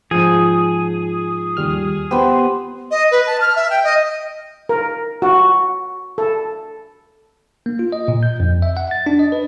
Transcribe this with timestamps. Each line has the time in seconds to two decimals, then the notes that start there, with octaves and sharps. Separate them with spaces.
0.11 G#2 F3 G#4
1.57 D#2 G3 F6
2.11 B3 G4 C5
2.90 D#5
3.11 B4
3.26 A5
3.40 F6
3.55 E5
3.69 G5
3.83 D#5
4.69 A#4
5.22 F#4
6.18 A4
7.66 A#3
7.79 F4
7.92 D#5
8.08 A#2
8.23 G6
8.40 F2
8.62 E5
8.77 F#5
8.91 A6
9.06 D4
9.19 D#5
9.32 B4